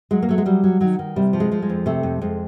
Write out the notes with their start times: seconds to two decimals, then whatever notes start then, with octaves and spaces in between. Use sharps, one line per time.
0.11 F#3 G#3
0.22 A#3
0.29 F#3 A3
0.38 G#3
0.45 F#3 G3
0.64 F#3
0.81 D#3 F#3
0.99 D#3
1.16 C3 G3
1.33 F3
1.40 G#3
1.52 F3
1.62 G#3
1.69 F2
1.86 C3 A3
2.03 F2
2.22 F2 G#3